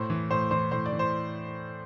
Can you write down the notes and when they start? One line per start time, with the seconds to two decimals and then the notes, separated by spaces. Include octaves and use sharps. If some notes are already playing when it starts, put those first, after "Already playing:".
Already playing: A2 C5
0.10 E3
0.30 A2 C5
0.51 E3 C5
0.71 A2 C5
0.86 D5
0.93 E3
0.99 C5